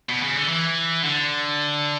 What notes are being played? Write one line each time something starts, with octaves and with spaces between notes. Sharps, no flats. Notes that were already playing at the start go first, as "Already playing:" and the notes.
B2
C#3
D3
E3
D3